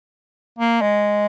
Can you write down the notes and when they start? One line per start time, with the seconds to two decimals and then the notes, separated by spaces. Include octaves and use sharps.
0.59 A#3
0.81 G#3